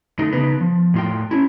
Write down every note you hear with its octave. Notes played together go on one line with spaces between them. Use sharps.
D3 A3 D#4
C#3 B3 D#4 B4
F3
A2 F4 G5
C#4 E4